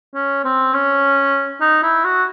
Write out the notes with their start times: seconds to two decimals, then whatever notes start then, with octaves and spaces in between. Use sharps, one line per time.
0.15 C#4
0.45 C4
0.74 C#4
1.61 D#4
1.83 E4
2.05 F#4